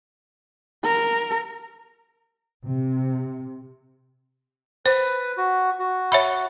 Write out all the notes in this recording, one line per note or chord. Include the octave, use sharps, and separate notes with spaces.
A#4
C3
B4 C5
F#4
F#4
C#5 E5 B5